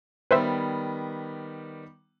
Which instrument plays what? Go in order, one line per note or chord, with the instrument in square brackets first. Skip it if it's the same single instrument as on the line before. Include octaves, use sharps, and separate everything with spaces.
[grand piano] D#3 G3 B3 [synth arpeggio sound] B4 C5 E5